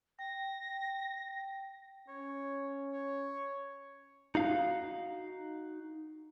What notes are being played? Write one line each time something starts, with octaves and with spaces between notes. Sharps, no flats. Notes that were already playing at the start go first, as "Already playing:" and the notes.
G5 A#6
C#4 C#5
C#5
D#4 F#4 F5